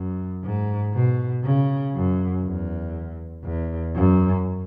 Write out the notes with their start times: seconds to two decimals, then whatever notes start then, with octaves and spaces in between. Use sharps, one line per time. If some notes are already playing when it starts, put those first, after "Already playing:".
Already playing: F#2
0.44 G#2
0.94 B2
1.44 C#3
1.95 F#2
2.45 E2
3.44 E2
3.95 F#2